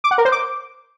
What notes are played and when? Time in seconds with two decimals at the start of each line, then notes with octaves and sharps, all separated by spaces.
0.04 D6
0.11 F#5
0.18 A#4
0.25 C5
0.32 D6